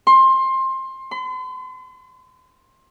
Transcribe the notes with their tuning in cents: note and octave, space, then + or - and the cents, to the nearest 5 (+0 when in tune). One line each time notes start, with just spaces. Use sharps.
C6 +20
C6 -45